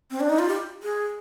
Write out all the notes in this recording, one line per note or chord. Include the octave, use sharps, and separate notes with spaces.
C4
D4
D#4
F4
G4
G#4